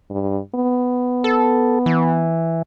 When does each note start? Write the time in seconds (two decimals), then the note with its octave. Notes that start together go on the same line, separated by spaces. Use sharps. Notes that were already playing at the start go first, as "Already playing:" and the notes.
0.10 G2
0.55 B3
1.24 A4
1.86 E3